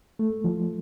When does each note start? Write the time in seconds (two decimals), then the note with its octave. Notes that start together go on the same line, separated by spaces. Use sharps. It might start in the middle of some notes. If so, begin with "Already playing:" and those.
0.19 A3
0.44 F3